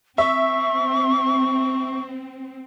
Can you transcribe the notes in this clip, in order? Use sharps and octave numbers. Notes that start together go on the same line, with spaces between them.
C4 E5 C#6